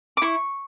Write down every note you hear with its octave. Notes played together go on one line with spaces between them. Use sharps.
D6
E4 C#6